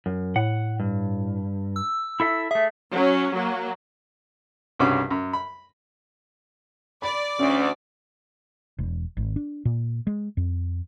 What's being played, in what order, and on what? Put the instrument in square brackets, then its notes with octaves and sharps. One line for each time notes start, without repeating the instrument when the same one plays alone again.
[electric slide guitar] F#2
[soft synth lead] A2 [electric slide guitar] F#5
[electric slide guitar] G2
[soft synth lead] E6
[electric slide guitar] E4 A4 E5
[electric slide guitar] A3 G#4 [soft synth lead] E5
[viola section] F#3 C#4
F#3 A#3
[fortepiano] C2 G2 C#3 C#4 F#4 D6
F#2
B5
[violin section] D5 [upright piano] B5
[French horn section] D2 [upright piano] C#4
[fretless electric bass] E1
G#1
D4
A#2
G#3
F2